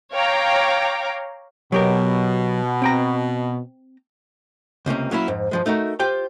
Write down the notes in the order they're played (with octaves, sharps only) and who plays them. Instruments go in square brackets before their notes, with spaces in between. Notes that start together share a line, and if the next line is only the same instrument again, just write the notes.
[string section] C#5 F5 G5 A#5 D6
[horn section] B2 [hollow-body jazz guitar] F#3 G4 A#4
[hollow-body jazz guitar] C4 G5 A#5
C#2 C3 A#3 C#4
F#3 A#3 C#4 E4
F2 G#2
G2 F3 G#3
A3 D#4 F#4 A#4
F4 G4 C5 G5